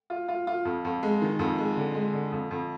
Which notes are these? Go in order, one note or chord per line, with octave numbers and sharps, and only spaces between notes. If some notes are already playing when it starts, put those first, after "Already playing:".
F4
F4
F4
F2
F2
G#3
D#3
F2
G#3
D3
G#3
D3
F2
F2